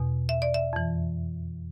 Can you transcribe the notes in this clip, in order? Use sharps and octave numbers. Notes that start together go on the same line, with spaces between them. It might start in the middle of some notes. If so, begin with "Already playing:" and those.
Already playing: E2 B2
E5
D5
E5
F2 E3